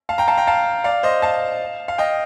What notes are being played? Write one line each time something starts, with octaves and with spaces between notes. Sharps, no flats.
F5 A5
G5 A#5
F5 A5
G5 A#5
F5 A5
D5 F5
C5 D#5
F5 A5
F5
D#5 G5